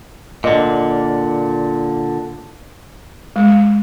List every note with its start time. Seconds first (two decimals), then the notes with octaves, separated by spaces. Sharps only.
0.44 A#2 D3 D#5
3.36 G#3